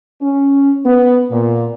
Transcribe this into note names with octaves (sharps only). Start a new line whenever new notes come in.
C#4
B3
A#2